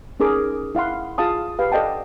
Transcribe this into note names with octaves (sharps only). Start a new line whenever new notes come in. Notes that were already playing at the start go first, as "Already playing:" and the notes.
C#4 D#4 G#4 A#4 D6
E4 F5 F#5 C6
F4 G#4 F5 A5 D#6
G4 B4 F5
A4 D5 D#5 F#5 G5 A5